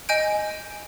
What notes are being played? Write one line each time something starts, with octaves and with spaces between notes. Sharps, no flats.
D#5 G#5 G6 D7